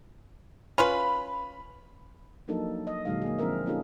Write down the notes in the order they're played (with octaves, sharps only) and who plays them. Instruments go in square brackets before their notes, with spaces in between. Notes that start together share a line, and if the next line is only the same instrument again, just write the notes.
[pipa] C#4 F4 B4 [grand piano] B5
[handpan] F3 F#3 A#3 D4 D#4 A4
D#5
A#2 D3 F#3 G#3 D#4 F5
A#3 G#4
F3 C4 D4 A#4 E5
A#3 C#4 D#4 F4 G#4 A4